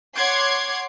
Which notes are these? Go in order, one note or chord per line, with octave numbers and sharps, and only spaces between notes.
C#5 F#5 C6 D6 G#6 C7